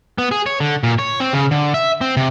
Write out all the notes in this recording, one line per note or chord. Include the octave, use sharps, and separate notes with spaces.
B3
G#4
C#5
D3
A#2
C#5
C4
C#3
D3
E5
C4
C3